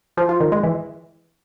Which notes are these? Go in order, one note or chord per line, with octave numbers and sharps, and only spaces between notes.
F3
F4
D#3
G#3
E3